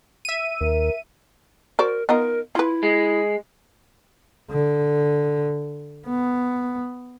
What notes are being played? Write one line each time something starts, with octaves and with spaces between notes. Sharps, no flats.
E5 D#7
D#2 A#4
F#4 A#4 C5 D5
B3 D#4 F4 A#4
E4 F4 B4
G#3
D3
B3